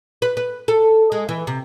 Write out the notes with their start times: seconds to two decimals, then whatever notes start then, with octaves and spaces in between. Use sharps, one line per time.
0.22 B4
0.37 B4
0.68 A4
1.12 G#3
1.29 E3
1.47 C3